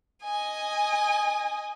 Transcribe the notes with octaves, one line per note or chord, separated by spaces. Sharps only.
D#5 G#5